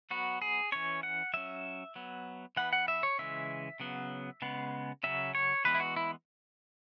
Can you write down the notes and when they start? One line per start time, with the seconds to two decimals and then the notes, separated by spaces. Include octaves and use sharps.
0.11 F#3 B3 F#4
0.42 G#4
0.72 E3 C#4 C#5
1.03 F#5
1.34 F#3 C#4 E5
1.96 F#3 B3
2.57 E3 B3 F#5
2.73 F#5
2.88 E5
3.03 C#5
3.19 C#3 E3 G#3 E5
3.80 C#3 F#3 B3
4.42 C#3 G#3 B3
5.03 C#3 F#3 C#4 E5
5.35 C#5
5.65 E3 G#3 B3 B4
5.74 E4
5.80 F#4
5.96 E4